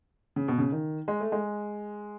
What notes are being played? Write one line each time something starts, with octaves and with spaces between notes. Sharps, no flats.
C#3
B2
C#3
D#3
G#3
A3
G#3